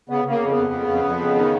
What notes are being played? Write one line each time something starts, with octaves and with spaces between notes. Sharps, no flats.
C#3 B3
C#3
A#3
F2
B3
F2
C#3
F2
F2
C#3
D#3